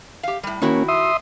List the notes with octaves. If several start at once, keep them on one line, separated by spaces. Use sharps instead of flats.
G4 F5
A2 G3
D#3 A#3 C#4 E4 F#4
E5 C6 D#6